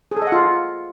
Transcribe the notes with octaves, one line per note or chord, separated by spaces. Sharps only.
G#4
A4
D#5
F#5
F4